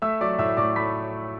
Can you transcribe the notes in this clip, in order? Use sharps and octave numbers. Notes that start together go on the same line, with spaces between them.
A3 E5 E6
F#3 D5 D6
A2 E5 E6
A2 D5 D6
A3 B5 B6